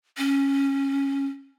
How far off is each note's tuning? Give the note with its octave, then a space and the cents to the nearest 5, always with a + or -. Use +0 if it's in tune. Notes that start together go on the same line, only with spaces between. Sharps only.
C#4 -10